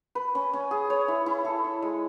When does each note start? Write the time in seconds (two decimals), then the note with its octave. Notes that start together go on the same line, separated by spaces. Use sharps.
0.15 B4
0.35 C#4
0.53 C#4
0.71 G#4
0.90 C#5
1.08 E4
1.26 E4
1.45 A4
1.64 E4
1.82 G#3